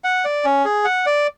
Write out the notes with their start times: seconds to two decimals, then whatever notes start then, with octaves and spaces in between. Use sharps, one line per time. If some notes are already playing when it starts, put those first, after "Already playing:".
0.04 F#5
0.25 D5
0.44 C#4
0.65 G#4
0.85 F#5
1.06 D5